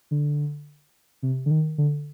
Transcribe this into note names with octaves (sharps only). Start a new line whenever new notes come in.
D3
C3
D3
D#3
D3